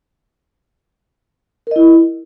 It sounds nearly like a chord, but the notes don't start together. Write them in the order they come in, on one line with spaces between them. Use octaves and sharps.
A#4 D#5 E4